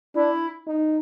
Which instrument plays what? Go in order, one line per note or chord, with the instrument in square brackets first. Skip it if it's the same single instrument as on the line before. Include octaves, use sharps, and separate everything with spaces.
[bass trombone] D4 [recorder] E4
[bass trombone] D#4